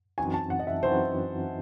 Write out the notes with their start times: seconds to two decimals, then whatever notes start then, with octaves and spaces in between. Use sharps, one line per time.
0.18 F#2 E3 C4 D#4 F#4 G#5
0.34 A5
0.50 F#5
0.59 D#5
0.67 E5
0.83 F#2 E3 C4 D#4 F#4 C5